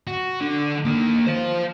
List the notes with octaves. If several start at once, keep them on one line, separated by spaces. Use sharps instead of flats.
F#4
D3 D4
D#3 A#3
C5 F5